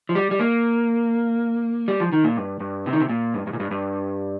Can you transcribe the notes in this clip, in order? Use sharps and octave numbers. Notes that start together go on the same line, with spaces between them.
F3
G3
G3
A#3
G3
F3
D#3
A#2
G2
G2
C3
D#3
C3
A#2
G2
G2
A#2
G2
G2